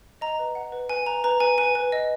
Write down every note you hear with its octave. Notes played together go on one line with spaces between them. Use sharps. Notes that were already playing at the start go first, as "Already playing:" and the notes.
D#5 A#5
B4
F#5
B4
B4 G#5
B4 A#5
B4 A#5
B4 G#5
B4 G#5
B4
D#5